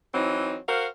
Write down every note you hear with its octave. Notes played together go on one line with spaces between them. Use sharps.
E3 F#3 C4 D#4
F#4 A#4 C5 F5